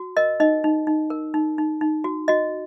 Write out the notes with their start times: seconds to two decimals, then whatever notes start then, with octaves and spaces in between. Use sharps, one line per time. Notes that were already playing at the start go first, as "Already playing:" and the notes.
Already playing: F#4
0.17 A#4 D#5
0.40 D#4 D#5
0.64 D#4
0.87 D#4
1.10 A#4
1.34 D#4
1.58 D#4
1.81 D#4
2.04 F#4
2.28 F#4 D#5